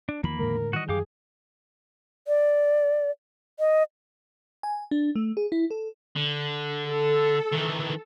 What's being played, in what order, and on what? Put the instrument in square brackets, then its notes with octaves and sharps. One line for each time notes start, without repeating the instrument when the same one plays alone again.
[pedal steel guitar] D4
[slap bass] E2 D#3 F3 [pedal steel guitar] A#3 B5
[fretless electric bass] A2 D3 G#3 [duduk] A#4
[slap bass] D#3 E3 G3 [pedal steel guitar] F#4 D#5
[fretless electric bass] F#2 [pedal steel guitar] G4 F5 D6 [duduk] G#4
[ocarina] D5
D#5
[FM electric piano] G#5
D4
A3
G#4
E4
A4
[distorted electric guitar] D3
[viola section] A4
[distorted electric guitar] D#3 E3